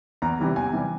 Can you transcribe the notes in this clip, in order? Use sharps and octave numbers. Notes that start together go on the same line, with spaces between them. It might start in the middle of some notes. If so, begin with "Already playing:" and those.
E2 A#5
C3 E3 G3
E2 G#5
C3 E3 G3